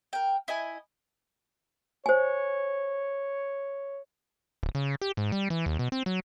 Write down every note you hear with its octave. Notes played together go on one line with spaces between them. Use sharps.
A#4 G5
E4 D#5 G#5
C5 C#5 G#5
D1
C#3
G4
G#2
G3
E3
D#2
B2
C4
F#3